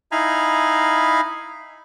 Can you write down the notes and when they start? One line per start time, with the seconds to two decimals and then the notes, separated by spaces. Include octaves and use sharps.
0.12 D#4 E4 F5 G#5 A#5 B5